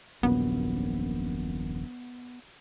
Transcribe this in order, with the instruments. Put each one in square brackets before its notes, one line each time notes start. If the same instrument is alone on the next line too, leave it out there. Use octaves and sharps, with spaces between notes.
[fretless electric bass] D#1 A#1 F#2 [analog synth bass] B3